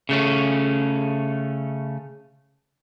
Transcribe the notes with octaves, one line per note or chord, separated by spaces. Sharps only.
C#3 A3 C#4